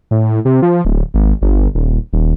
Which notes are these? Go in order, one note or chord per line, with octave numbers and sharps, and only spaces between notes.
A2
C3
F3
D1
G#1
G1
D#1
D#1